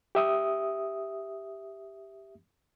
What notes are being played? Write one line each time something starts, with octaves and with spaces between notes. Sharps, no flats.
G4 E5 D#6